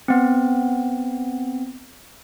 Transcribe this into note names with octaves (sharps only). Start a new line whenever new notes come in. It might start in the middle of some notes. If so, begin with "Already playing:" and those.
B3 C4